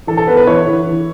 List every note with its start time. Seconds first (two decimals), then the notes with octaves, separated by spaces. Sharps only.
0.07 E3 A4
0.17 A4
0.27 B3 B4
0.37 B4
0.47 E3 C#5
0.66 E3
0.86 E3